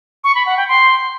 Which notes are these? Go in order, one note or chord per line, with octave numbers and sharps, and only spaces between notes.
C#6
B5
F#5
G5
C6